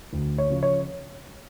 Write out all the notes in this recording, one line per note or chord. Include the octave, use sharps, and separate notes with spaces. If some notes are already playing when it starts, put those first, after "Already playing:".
D2
C#5
C#3 F3
C#5